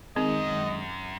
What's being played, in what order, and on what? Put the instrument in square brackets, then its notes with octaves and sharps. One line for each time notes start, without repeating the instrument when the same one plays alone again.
[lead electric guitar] F#2 [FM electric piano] D#3 G#3 [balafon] C4 [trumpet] D#5